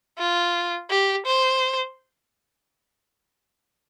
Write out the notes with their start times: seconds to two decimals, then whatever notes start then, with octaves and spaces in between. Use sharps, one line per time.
0.19 F4
0.90 G4
1.26 C5